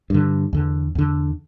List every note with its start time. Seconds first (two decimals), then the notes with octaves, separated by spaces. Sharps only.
0.10 G2 D3
0.53 E2 D3
0.95 E2 D3